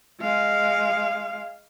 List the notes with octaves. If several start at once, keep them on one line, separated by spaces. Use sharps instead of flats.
G#3 F5